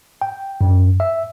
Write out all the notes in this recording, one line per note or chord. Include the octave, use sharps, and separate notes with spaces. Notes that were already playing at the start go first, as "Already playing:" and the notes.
G5
F#2
E5